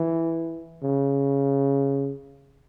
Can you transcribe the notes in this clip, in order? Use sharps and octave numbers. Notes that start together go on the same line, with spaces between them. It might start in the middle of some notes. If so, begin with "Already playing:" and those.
Already playing: E3
C#3